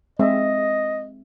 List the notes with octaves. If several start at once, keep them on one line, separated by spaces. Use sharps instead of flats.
G#3 C4 D#5 E5